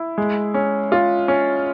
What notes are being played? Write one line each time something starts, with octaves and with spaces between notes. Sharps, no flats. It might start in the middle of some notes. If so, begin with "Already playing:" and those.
Already playing: E4
G#3
C#4
F4
C#4